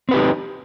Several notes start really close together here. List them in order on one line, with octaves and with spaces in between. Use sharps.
C4 B4 G4 D#4